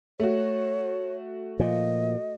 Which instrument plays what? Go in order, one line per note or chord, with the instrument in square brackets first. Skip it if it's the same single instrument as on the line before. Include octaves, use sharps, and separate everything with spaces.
[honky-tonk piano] A3 F#4 [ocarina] C#5
[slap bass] A#2 F3 [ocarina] D#5